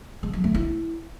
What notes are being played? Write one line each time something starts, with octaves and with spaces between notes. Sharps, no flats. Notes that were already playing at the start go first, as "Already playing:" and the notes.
G#3
F#3
A3
E4